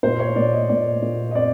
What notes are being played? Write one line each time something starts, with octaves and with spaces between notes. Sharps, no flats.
A#2 C5
C#5
A#2 D5
D#5
A#2 D5
A#2
D#5
C4 D5